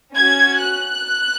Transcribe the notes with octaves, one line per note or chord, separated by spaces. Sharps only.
C#4 F#4 G#6
F#6